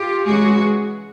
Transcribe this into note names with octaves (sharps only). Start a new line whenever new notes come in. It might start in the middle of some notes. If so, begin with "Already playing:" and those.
Already playing: F4 G4
C#3 E3 G#3 F#4 G#4